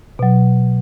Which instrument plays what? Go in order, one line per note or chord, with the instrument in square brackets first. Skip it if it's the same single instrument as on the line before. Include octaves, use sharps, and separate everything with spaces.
[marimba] B2 F#3